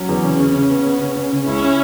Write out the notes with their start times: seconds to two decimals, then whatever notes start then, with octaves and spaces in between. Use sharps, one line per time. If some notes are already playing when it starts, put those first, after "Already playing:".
Already playing: F#3 C#4
0.09 E2
0.24 C#3
0.40 C#3
0.55 C#3
0.70 B3
0.86 B3
1.02 C#3
1.16 C#3
1.32 C#3
1.47 C#2 C#4 E4